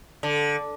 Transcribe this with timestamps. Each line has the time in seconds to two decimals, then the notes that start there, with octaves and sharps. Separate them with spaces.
0.23 D3